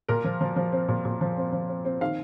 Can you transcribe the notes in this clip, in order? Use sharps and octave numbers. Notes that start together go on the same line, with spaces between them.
A#2 A#4
F3
F3
F3
C4
A#2
A#2
F3
C4
F3
C4
C4
D#3 F5